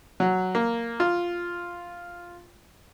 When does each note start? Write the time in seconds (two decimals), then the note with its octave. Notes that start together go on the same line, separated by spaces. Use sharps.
0.20 F#3
0.55 A#3
1.00 F4